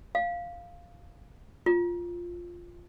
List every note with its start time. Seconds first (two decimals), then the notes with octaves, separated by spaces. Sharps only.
0.15 F5
1.66 F4